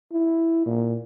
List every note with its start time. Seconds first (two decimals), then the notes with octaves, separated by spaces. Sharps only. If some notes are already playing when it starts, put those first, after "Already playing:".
0.12 E4
0.66 A#2